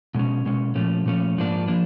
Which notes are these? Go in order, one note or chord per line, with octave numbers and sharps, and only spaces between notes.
B2 G#3 C#4
B2 G#3 C#4
A#2 F3 A3 C#4
A#2 F3 A3 C#4
G#2 F3 A#3 D4
F3 A#3 D4